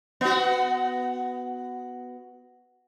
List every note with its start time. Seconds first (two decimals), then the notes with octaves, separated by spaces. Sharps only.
0.21 B3 F#4